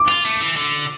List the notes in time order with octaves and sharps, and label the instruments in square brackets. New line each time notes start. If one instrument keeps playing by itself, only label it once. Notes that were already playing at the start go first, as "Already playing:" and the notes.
Already playing: [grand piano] D6
[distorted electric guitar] F4
A3
E3
D3